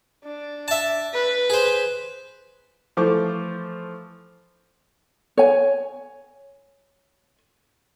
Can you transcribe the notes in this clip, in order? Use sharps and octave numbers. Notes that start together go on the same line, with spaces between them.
D4
E5 A5
B4
G#4 C5
E3 F3 A3 C5 C#6 D6
C#5 G#5